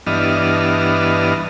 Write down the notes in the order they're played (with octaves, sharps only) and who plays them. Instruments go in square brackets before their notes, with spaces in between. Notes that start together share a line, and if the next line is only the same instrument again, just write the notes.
[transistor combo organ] G2 E3 B3 D4 D#5 F6